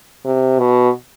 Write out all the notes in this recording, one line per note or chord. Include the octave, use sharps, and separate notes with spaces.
C3
B2